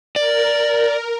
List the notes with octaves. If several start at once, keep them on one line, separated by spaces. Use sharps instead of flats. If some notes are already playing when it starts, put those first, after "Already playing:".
A#4 D5